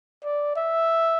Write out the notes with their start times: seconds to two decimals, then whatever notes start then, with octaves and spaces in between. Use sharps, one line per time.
0.24 D5
0.56 E5